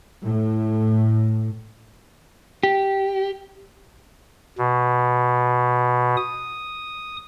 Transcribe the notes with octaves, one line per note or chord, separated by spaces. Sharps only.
A2
G4
B2
D#6